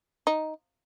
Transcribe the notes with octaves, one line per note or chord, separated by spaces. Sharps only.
D#4